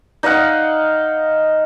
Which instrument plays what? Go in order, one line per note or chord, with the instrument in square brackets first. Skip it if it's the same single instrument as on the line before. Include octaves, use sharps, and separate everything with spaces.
[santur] D#4 D#5 F5 F#5